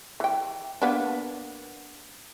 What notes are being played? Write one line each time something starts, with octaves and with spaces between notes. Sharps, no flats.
E3 G5
A#3 B3 D4